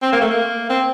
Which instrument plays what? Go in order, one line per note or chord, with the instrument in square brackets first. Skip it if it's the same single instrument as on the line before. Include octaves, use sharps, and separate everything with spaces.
[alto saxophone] C4
A#3
A3
A#3
C4